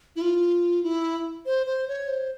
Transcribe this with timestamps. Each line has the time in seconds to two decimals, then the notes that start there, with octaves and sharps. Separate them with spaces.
0.16 E4
0.21 F4
0.83 E4
1.46 C5
1.66 C5
1.88 C#5
2.08 C5